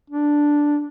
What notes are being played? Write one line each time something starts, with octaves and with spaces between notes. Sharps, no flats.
D4